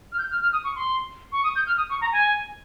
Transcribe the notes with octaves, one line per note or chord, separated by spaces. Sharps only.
F6
G6
F6
F6
D#6
C#6
C6
C#6
D#6
G6
F6
D#6
C#6
A#5
G#5